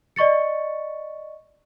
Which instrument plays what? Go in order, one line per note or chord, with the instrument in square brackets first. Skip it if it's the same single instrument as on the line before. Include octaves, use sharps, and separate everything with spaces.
[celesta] D5 D#5 C#6 A6 C#7